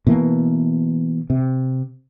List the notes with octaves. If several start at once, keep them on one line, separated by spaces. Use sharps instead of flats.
B2 E3 A#3
C3